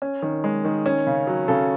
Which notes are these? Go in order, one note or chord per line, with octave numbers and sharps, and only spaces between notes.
C#4
D#3
G#3
D#3
C#4
C#3
F#3
C#3 A4